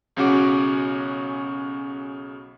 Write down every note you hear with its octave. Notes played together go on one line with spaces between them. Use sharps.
B1 C#3 C#4 F#4 D6